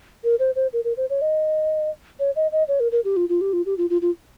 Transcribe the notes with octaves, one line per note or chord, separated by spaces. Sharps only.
A#4
C5
C5
A#4
A#4
C5
C#5
D#5
C#5
D#5
D#5
C#5
A#4
A#4
G4
F4
F4
G4
F4
G4
F4
F4
F4